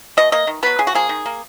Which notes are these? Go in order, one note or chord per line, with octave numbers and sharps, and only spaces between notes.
B2 D#5
A#3 D#5
D#3
F#3 B3 B4
C#3 G#4
F#4
F3 A#3 G#4
D#3
A#3